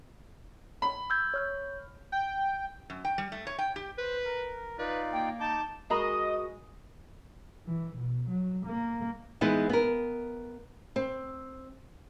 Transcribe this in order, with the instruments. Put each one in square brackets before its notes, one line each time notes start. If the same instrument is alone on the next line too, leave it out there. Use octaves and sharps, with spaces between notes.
[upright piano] B5
[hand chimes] E6 G6 G#6
C#5 F6 G6
[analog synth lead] G5
[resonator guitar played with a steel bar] F#2
G5
G3
A3
C#5
G5
G4
[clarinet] B4 [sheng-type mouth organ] C5
[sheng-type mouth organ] A#4
[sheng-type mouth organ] D#4 F4 D5 [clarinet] B4
[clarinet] A#3 [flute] G5
[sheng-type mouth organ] D#4 D6 G6 [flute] A5
[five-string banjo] G#3 A#5 B5 [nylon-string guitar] F#4 G#4 A#4 [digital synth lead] D#5 [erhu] D#6
[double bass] E3
B2
F#3
A#3
[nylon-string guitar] E3 G#3 B3 D#4
B3 A#4
C4